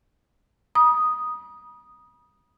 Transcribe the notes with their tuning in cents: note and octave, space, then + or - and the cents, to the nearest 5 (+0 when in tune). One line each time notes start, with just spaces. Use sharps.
B5 -45 D#6 +0